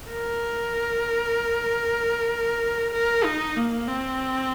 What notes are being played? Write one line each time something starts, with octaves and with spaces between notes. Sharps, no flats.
A#4
A#4
D#4
A#3
C4